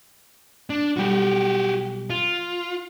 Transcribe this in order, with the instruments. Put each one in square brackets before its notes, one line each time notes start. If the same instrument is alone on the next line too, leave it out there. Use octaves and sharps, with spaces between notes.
[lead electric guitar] D4
[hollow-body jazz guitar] B1 G3 [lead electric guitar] F#4 G4
[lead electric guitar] F4